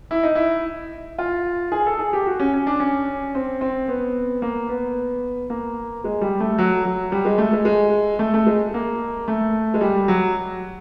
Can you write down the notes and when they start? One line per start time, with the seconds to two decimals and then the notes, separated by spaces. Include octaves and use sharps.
0.11 E4
0.23 D#4
0.35 E4
1.18 F4
1.72 G#4
1.86 A4
1.99 G#4
2.13 G4
2.27 F#4
2.40 C#4
2.54 C#4
2.67 D4
2.80 C#4
3.35 C4
3.61 C4
3.88 B3
4.42 A#3
4.69 B3
5.50 A#3
6.04 G#3
6.21 G3
6.40 A3
6.58 F#3
6.85 F#3
7.12 G3
7.25 G#3
7.38 A3
7.53 G#3
7.65 G#3
8.19 A3
8.34 A3
8.46 G#3
8.74 A#3
9.28 A3
9.74 G#3
9.81 G3
10.08 F#3